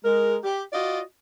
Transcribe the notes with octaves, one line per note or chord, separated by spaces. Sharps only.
G#3 A#4
G4
F4 F#4 D5 D#5